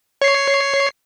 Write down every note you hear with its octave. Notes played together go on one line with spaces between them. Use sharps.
C#5 C7